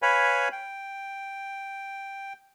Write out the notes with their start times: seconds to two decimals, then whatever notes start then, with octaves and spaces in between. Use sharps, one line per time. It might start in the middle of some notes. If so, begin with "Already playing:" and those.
0.02 B4 C#5 F5 G#5 B5
0.52 G5